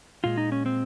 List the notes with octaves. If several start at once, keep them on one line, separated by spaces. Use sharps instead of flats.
A#2 G#3 F4
D#4
C#4
C4